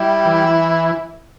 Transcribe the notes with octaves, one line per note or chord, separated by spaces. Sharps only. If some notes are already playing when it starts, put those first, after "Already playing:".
Already playing: G3 E4
E3